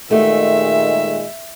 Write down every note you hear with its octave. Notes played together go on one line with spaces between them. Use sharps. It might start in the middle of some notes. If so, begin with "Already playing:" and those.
A#2 D#3 G#3 A3 F#4 G4 E5